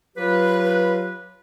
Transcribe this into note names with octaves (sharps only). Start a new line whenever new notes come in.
F#3 F4 G4 B4